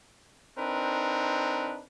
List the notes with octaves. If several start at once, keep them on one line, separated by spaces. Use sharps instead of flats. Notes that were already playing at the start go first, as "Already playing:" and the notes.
C4 D4 D#4 A#4 B4